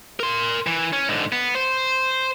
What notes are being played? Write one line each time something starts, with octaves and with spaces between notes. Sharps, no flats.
A#4 C6
E3
C#4
G#2 D3
B3
C5